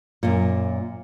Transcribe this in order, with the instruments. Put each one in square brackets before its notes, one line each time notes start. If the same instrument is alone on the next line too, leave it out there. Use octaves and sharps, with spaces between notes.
[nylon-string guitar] F#2 A#2